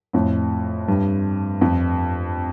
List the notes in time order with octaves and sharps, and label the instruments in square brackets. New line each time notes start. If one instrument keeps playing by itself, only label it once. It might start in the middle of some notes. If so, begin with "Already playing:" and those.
[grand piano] F2 A2
G2
F2